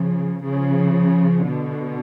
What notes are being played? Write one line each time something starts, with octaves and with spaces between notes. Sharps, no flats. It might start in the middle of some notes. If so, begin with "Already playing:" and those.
Already playing: C#3 F3
C#3 F3
B2 D3